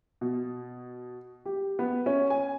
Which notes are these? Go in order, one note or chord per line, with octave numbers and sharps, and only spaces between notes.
B2
G4
B3
C#4
G#5